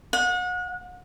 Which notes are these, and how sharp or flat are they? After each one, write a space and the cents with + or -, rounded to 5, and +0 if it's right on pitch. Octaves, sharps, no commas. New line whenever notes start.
F#5 -35